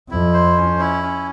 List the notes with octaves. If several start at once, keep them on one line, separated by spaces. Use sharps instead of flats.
F2 E4
C5
C#4
E4
C#4